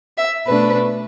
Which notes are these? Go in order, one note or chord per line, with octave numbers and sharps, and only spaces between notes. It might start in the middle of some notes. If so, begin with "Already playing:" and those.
E5
B2 A3 D4 B4